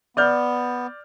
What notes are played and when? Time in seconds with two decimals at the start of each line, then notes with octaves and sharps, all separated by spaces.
0.17 B3 D5 F6 G6